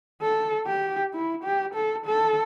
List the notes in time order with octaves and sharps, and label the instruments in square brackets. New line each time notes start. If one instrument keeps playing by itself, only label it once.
[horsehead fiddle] A4
G4
E4
G4
A4
A4